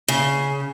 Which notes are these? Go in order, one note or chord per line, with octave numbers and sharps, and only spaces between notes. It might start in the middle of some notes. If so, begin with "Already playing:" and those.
C#3